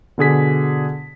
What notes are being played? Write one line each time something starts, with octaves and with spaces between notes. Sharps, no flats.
B2 D3 G#4 B6